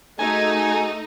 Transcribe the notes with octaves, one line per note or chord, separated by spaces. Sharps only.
A3 D#4 F#4 G#4 D#5 G#5